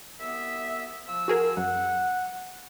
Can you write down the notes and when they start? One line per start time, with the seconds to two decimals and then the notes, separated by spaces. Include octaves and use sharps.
0.19 C2 B3 E5
1.08 F3 E6
1.28 F#4 G#4 A#4
1.57 F#2 F#5